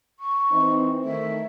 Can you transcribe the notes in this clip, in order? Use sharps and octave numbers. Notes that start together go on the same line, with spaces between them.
C#6
E3 C4 D#4
D#3 A3 E5